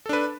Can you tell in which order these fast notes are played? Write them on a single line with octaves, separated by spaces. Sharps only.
A4 D4 B4